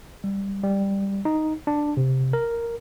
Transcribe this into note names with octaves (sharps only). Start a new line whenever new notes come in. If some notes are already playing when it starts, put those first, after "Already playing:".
G3
G3
D#4
D4
C3
A#4